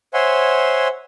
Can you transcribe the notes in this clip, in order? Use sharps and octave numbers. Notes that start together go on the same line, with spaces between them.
C5 C#5 E5 F#5 G#5 C6